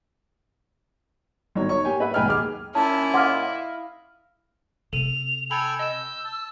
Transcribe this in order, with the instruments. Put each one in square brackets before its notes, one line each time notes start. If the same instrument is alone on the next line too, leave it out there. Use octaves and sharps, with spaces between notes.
[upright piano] G1 D#3 F#3 C#5
C#5 C#6
A#3 G4 G#5
B4 E5 F#5
B1 G#2 B4 G5 G#5 F6
D#2 G#4 D6 F6
[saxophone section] A#2 C#4 [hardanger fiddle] E4 [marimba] A5
[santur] D#5 F5 [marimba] F#5 C6 D6
[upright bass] C3 C4 [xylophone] A4 D#7 [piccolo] F7
[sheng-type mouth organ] A4 G5 G#5 [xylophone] B5
[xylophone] D#5 E7 [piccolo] E6 [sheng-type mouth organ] G6
[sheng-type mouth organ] A5